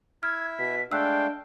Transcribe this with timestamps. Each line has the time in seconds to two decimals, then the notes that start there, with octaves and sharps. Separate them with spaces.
0.23 E4 E5 F6 G#6
0.59 B2 B6
0.92 G#3 A3 D4 F5 G5 E6 F#6